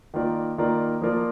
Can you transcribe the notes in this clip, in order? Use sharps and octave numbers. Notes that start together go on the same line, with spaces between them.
D#3 A#3 F4 A#4 D5
D#3 A#3 F4 A#4 D5
F3 A#3 F4 A#4 D5